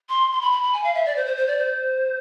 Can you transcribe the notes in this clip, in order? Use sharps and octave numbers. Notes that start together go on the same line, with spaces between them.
C6
C6
B5
B5
B5
G#5
F5
E5
D5
C5
C5
C5
D5
C5